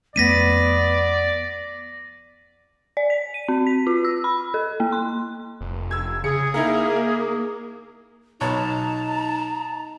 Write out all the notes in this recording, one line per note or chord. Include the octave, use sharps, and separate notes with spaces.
F2 A3 B3 C#4 D5 A#6 B6 D#7
D5
B6
D#7
C4
B6
F4
E6
B5
A4
A#3
C6
F1
E6 G#6
C#3 G#4 C#7
A#3 D#4 E4 A#4
B1 B3 D#4 C#5 A5 A#5